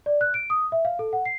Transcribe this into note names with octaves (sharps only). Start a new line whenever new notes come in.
D5
F#6
D7
D#6
E5
F5
A4
F#5
C7